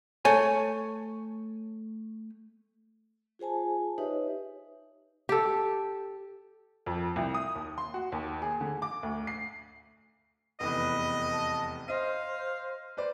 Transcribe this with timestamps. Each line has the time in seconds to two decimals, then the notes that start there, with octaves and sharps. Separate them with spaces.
0.25 A3 C#5 G#5
3.39 F4 G#4 C5 G#5 A5
3.98 D#4 G4 B4 C#5 D#5 E5
5.29 G4 A4
6.86 F2
7.16 C2
7.34 D#6
7.55 D#2
7.78 C6
7.94 F#4
8.12 D#2
8.42 G#4
8.61 D3
8.82 D6
9.03 D2
9.27 C7
10.60 F1 E2 B4 D#5
11.31 A5
11.88 C5 D#5 F5 D#7
12.97 B4 C5 D5